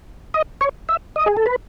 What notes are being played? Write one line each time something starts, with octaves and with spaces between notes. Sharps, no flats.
D#5
C#5
E5
D#5
G#4
A4
B4